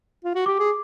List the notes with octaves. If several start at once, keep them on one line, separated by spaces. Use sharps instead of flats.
F4
F#4
G4 D6
G#4